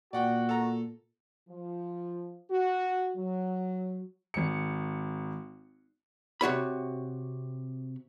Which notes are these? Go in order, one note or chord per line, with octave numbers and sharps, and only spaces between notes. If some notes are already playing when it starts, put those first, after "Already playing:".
A#2 F#4 D5 F#5 G5
A4 A#5
F3
F#4
F#3
G#1 C#7
C3 F#4 C#5 B5